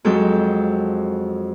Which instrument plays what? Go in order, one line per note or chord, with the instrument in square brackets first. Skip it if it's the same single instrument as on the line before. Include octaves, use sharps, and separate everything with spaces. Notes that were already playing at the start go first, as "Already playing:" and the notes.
[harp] F2 F#3 G#3 C4 A4 G6